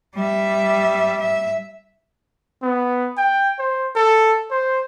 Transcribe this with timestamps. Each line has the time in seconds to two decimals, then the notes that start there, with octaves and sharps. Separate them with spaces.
0.16 G3 E5
1.20 E5
2.62 B3
3.17 G5
3.59 C5
3.95 A4
4.51 C5